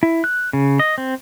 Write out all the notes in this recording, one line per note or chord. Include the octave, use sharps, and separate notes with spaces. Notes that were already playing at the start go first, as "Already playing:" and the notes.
E4
F#6
C#3
D#5
C4